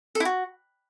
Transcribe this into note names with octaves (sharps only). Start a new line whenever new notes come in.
A4
E4
F#4